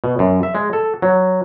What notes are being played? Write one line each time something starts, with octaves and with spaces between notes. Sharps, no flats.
B2
F#2
E5
G#3
A4
F#3